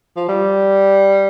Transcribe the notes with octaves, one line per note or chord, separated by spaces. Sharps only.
F3
G3